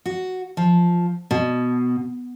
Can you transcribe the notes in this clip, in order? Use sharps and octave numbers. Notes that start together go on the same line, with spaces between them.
F#4
F3
B2